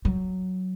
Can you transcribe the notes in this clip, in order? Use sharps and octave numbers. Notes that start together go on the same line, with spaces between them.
F#3